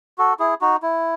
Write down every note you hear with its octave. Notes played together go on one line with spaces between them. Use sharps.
F#4 A4
E4 G#4
D#4 F#4
E4